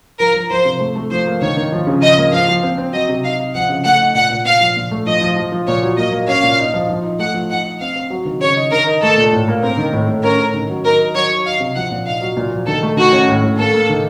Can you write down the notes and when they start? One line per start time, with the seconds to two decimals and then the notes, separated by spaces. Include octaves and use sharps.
0.19 F3 A#4
0.34 F3
0.50 F3 C5
0.65 C3
0.80 A3
0.96 A3
1.10 F3 C5
1.26 A#3
1.41 D#3 C#5
1.57 D#3
1.72 F3
1.87 C#3
2.02 F3 D#5
2.18 A#3
2.32 F3 F5
2.48 F3
2.63 C4
2.78 C4
2.93 F#3 D#5
3.09 C3
3.24 D#4 F5
3.40 D#4
3.55 F3 F#5
3.69 C#3
3.85 A3 F#5
4.00 D#4
4.15 A#2 F#5
4.30 A#2
4.45 A#2 F5
4.61 F3
4.77 A#2
4.91 A3
5.07 F3 D#5
5.21 F3
5.36 F3
5.52 F3
5.67 A#2 C#5
5.83 F#3
5.97 A#3 D#5
6.12 A#3
6.27 C#4 F5
6.43 A#2
6.59 D#4
6.74 F3
6.89 F3
7.04 D#4
7.19 A3 F#5
7.34 F3
7.49 D#4 F#5
7.65 D#4
7.80 C4 F5
7.95 C4
8.10 F#3
8.25 D#3
8.40 C#3 C#5
8.56 D#4
8.72 D#3 A#4
8.86 D#4
9.02 A3 A4
9.17 A#2
9.33 A2
9.48 A#3
9.63 C4 A#4
9.77 D#3
9.93 A2
10.09 A2
10.23 C#4 A#4
10.39 C#4
10.54 D#3
10.69 F#3
10.84 D#4 A#4
11.00 D#4
11.15 F#3 C#5
11.30 D#4
11.45 D#4 F5
11.60 C3
11.75 F3 F#5
11.91 A#2
12.06 D#4 F5
12.21 F#3
12.37 A#2
12.52 F3
12.67 D#3 A4
12.82 A3
12.97 D#3 F#4
13.12 C#4
13.28 A2
13.44 A2
13.58 A#3 A4
13.74 A#3
13.89 D#3